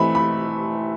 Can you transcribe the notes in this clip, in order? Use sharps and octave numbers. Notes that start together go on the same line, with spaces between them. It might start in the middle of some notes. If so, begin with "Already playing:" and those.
Already playing: E3 A3 C4 B5
B5